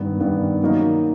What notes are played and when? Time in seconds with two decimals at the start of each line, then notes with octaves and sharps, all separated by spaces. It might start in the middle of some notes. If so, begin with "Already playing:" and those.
Already playing: G2 D#3 G3 B3
0.20 G2 D#3 G3 B3
0.62 D#3 F#3 A#3 D#4